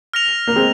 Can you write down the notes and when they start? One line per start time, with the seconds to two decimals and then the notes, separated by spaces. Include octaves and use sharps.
0.14 F6 A#6 F7
0.48 A#3
0.56 G#3 C4